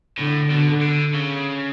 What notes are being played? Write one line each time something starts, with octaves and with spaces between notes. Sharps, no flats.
A2 D3
B2 D3
D3
C#3